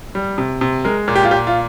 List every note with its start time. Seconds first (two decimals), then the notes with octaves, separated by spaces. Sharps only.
0.15 G3
0.38 C3
0.61 C3
0.85 G#3 A#4
1.08 A#2
1.15 G4
1.24 F4
1.31 A#2 G4
1.47 F4